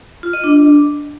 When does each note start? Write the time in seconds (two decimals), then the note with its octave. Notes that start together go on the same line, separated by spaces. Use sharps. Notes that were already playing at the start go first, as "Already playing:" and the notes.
0.23 F4
0.33 D#5
0.44 D4